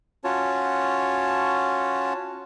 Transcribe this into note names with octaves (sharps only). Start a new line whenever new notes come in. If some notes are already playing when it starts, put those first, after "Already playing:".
C#4 F4 F#4 C#5 A5